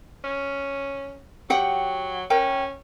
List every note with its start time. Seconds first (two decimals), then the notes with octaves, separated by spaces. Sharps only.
0.24 C#4
1.50 F#3 G4 F#5 G5
2.30 C#4 A#4 G5